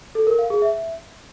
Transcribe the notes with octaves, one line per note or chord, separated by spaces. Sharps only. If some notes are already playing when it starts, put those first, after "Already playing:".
A4
A#4
F5
G#4
E5